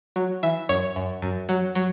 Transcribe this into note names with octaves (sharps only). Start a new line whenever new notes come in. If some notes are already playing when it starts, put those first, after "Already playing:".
F#3
E3 E5
F#2 C#5
F#2
F#2
F#3
F#3